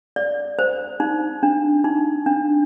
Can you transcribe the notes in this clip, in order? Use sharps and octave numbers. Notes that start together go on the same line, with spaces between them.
D5
C5
D#4
D4
D#4
D4